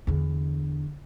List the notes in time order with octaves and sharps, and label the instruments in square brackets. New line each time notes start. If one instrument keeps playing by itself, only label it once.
[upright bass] E2 D3